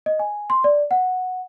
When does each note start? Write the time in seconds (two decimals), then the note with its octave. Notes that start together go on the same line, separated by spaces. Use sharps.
0.06 D#5
0.19 G#5
0.50 C6
0.64 D5
0.91 F#5